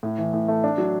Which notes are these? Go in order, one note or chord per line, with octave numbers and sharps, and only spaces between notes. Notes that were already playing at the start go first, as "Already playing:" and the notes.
A2
E3
A2
A3
D4
F#3